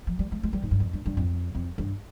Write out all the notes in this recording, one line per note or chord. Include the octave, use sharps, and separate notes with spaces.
F3
G3
G#3
G#3
G3
G#2
G2
F2
G2
G2
F2
F2
G2